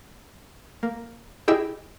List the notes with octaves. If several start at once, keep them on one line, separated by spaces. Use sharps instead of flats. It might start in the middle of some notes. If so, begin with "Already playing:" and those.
A#3
E4 G4 G#4 D#5 G5 E6